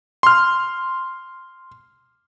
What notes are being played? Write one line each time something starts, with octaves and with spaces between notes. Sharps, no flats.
C6 F6